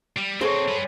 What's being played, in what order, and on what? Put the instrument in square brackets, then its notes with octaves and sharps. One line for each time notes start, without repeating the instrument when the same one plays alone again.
[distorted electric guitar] G3
[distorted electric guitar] C4 D#4 [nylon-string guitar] G#4 A4 C5 [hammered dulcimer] C#5 G#5 C6
[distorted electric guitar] G3 B4